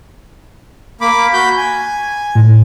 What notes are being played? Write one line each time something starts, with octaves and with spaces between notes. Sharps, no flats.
A#3 B5 D6
F#4 B5 G6
G#5
A2